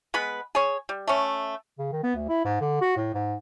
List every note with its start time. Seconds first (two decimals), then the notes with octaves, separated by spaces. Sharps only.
0.14 G#3 B3 B4
0.55 G#4 C#5
0.89 G3
1.08 A3 C#4
1.79 C#3
1.92 D#3
2.03 B3
2.16 D2
2.29 E4
2.45 G#2
2.61 D3
2.81 F#4
2.97 A2
3.14 G#2